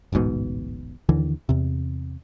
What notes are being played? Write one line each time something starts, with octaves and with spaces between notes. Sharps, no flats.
D1 A1 G#2 B2
D#2 D3 E3
E2 C3